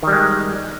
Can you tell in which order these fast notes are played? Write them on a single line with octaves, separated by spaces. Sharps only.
D#3 G3 G#3